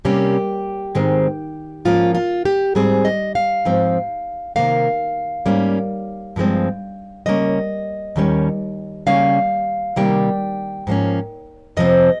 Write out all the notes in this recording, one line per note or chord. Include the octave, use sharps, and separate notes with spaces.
C3 G3 A#3 C#4 G4
G#2 D#3 G#3 C4
G#2 F3 A#3 C#4 F4
F4
G4
G#2 G3 C4 G#4
D#5
F5
G#2 F3 C4
C3 D#3 A#3 F5
G#2 G3 A#3 C#4
G2 F3 G#3 C4
C#3 G3 A#3 C#4 D#5
D#2 D#3 G3 C#4
C#3 G3 A#3 C#4 F5
C3 D#3 G3 A#3 G5
G#2 F3 A#3 C#4
F2 C3 F3 C4 D#5